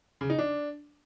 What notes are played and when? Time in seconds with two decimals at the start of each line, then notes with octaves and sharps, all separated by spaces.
0.21 C#3
0.30 D#4
0.39 D4